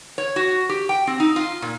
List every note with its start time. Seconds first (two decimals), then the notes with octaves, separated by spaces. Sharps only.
0.18 C#5
0.36 F#4
0.69 G4
0.89 G5
1.07 C4
1.20 D#4
1.36 F4
1.62 A#2